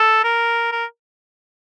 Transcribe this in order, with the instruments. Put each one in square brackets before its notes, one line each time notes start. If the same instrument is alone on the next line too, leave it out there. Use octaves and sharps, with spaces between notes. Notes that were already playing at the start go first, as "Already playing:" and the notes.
Already playing: [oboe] A4
A#4
A#4